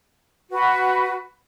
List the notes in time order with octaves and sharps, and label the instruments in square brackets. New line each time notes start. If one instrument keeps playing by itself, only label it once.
[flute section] F#4 B4